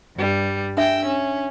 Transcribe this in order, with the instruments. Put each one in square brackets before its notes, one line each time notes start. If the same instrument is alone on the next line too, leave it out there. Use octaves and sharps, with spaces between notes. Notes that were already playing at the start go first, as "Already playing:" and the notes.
[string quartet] G2 G3
[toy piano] D4 E5 [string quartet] G5 E6
[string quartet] C#4